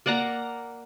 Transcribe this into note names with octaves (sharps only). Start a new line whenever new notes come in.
A#3 D5 F#5 A#5